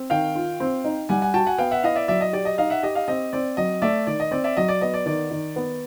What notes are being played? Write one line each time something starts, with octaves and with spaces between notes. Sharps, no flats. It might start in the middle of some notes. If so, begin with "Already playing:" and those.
Already playing: C4
D#3 F5 G5
F4
C4
D#4
G3 F#5 G#5
F#5 G#5
F#4 G5 A5
F#5 G#5
B3 F5 G5
E5 F#5
E4 D#5 F5
D5 E5
F#3 D5 E5
D#5
G4 D5
D#5
D#4 D#5 F5
E5 F#5
G4 D#5
D#5 F5
C4 D#5
C4 D5
F#3 D#5
A3 D5 E5
D#3 D5
D#5
C4 D5
D5 E5
F#3 D#5
D5
B3 D#5
D5
D#3 D5
D#3
B3